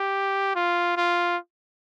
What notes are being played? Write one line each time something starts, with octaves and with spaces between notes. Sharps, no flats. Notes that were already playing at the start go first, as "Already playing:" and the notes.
Already playing: G4
F4
F4